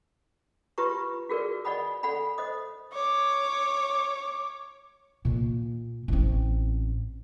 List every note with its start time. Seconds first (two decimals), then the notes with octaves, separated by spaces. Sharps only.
0.78 F4 G4 B4 A#5 C#6
1.29 F#4 G#4 A#4 B4 D5
1.64 D5 D#5 F#5 G#5 B5 D#6
2.03 A4 D5 F#5 G#5 B5
2.38 C5 D#5 D#6
2.93 C#5 D6
5.25 A#2 A#3
6.08 A1 C4